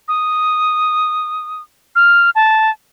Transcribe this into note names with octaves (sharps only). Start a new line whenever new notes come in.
D#6
F6
A5